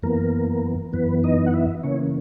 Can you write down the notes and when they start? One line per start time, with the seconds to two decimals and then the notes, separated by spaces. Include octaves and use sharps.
0.03 F#2 E3 A#3 B3 A#4
0.93 F#2 E3 B3 B4
1.24 D#4 D#5
1.46 F#5
1.54 E4 E5
1.83 C#3 E3 A#3 C#4 C#5